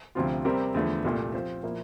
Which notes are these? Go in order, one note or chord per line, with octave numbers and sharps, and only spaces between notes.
D2 C3 F3 C4 F4
C3 G3 C4 G4 A#4
E2 D3 F3 A3
C2 A#2 A3
F3 C4 F4 C5
A#2 F3 A#3 E4